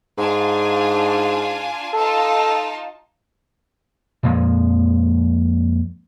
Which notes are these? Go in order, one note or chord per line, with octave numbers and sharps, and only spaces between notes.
G#2 D4 F4 G#5
D#4 F4 A4 A5
F2 A#2 F3 G#3